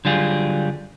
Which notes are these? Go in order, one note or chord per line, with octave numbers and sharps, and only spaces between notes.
D3 F#3 G3 F4 G#4